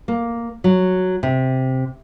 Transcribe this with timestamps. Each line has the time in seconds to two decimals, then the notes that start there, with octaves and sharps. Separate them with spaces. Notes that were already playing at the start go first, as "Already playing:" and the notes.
0.08 A#3
0.64 F#3
1.23 C3